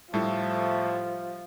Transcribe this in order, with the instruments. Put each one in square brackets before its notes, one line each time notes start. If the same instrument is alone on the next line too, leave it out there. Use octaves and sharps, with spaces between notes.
[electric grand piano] A2 A4 [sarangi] F3 [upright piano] G3 F4 [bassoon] A3